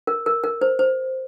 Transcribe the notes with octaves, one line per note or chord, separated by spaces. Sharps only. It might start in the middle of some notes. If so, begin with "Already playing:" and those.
A#4
A#4
A#4
C5
C5